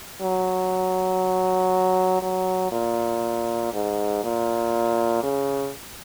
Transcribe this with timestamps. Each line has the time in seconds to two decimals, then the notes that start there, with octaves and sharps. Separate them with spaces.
0.22 F#3
2.22 F#3
2.72 A#2
3.73 G#2
4.24 A#2
5.23 C#3